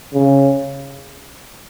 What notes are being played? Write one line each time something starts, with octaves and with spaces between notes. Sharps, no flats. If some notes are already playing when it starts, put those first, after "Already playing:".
C#3